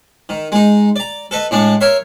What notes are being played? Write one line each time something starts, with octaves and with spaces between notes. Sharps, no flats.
D#3
G#3 D#4
D5 A#5
A4 B4 D#5
A2 G#3 D4 C#6
A#4 C#5 E5 C6